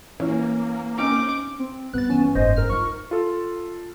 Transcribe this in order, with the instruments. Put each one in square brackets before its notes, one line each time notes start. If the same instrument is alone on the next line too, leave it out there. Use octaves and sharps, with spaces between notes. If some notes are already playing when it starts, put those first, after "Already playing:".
[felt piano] E3 C#4 [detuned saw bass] A#3
[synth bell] C4 C#4 D#4 [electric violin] D6
[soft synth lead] C4
[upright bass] G1 [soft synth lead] B3 [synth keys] F#6 A6
[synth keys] E3 C#4
[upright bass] F#1 [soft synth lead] G#2 [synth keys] C5 D#5
[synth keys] A#4 F6
[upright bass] D#4 F4 [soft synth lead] C#6
[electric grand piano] F4 A4